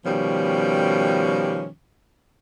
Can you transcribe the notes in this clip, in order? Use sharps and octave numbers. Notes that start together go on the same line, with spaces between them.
B2 D#3 F3 G3 C#4